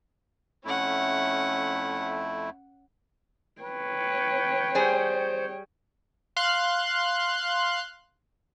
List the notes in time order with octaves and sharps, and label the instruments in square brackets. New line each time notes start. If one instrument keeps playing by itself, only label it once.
[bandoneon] F2 A3 E4 [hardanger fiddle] C#4 F#5
[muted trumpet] B4 [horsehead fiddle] C#5 G5
[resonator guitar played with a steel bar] G3 G#4 [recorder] C5
[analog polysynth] F5 C6 F#6